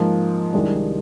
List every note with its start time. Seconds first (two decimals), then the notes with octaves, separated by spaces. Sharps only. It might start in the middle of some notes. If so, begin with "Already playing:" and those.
Already playing: G#2 F3 A#3
0.53 C2 C3 D#3 G#3 D4